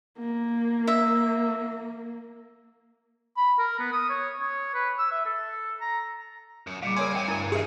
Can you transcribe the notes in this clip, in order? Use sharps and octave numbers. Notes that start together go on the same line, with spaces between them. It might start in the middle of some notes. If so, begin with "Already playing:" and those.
A#3
E5
B5
A#4
B3
D#6
C#5
C#5
B4
E6
E5
A4
A#5
F#2
A#2 C#3 G3 F5 D6
A#3 A#4 C#5 G#5 C6
E3 C4 A#4 E5 G5
D2 G2 E3 E4 A#4 A#5
B1 D#3 G4 G#4 E5